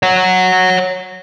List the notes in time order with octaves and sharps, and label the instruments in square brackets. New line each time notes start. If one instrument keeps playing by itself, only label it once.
[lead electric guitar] C#5 F#5